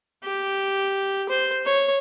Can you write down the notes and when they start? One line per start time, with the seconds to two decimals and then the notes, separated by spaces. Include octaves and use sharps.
0.24 G4
1.29 C5
1.66 C#5